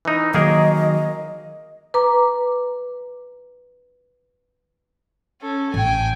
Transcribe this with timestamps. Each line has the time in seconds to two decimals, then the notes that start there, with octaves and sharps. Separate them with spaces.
0.05 E3 D#4
0.34 D#3 F#3 A#3 G#4 A#4 D#5
1.94 B4 A#5 D6
5.41 C#4 A4
5.74 A1 G5 G#5